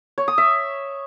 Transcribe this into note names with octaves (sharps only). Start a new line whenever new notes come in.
C#5
D#6
E5